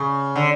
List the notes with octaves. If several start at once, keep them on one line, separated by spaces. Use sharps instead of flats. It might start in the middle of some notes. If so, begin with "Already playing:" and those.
Already playing: C#3
D3